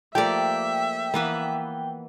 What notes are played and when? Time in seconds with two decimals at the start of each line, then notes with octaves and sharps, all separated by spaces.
0.15 F3 A3 A#3 G4 D5 E5 G5
1.14 E3 A#3 B3 B4